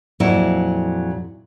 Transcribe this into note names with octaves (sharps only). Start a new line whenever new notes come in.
F2 A#2 F#3 E4 F#4